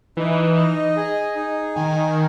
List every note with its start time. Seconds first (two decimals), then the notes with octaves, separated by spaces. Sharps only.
0.17 E3 D#4
0.57 D#5
0.96 G#4
1.35 D#4
1.75 D#3 G#5